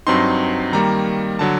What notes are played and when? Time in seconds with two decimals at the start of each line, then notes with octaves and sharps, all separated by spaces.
0.07 G2 F#3 C4 D#4 C6
0.73 D#3 G3 A#3 A#5
1.39 D3 F#3 A5